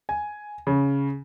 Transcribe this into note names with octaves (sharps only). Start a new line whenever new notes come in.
G#5
C#3